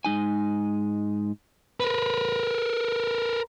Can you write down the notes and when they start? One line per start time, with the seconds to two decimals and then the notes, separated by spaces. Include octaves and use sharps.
0.05 G#2 G#3 D#4 G#5
1.80 A#4 B4